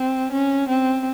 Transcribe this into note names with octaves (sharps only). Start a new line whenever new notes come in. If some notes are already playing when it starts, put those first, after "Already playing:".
Already playing: C4
C#4
C4